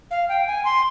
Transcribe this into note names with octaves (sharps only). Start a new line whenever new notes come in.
F5
G5
G#5
C6